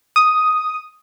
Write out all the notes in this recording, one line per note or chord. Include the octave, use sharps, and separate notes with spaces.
D#6